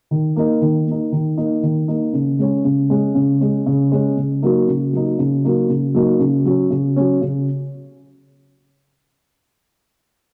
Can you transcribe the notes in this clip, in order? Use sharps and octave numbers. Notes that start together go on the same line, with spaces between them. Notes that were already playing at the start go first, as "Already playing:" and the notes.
D#3
A#3 D#4
D#3
A#3 D#4
D#3
A#3 D#4
D#3
A#3 D#4
C#3
G#3 C#4
C#3
G#3 C#4
C#3
G#3 C#4
C#3
G#3 C#4
C#3
F#3 A#3 D#4
C#3
F#3 A#3 D#4
C#3
F#3 A#3 D#4
C#3
F#3 A#3 D#4
C#3
F#3 C#4
C#3
F#3 C#4
C#3